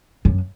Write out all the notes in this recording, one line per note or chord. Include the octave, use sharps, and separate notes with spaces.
F#2